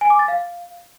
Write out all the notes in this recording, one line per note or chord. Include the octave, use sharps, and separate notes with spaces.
G#5
D6
A6
F5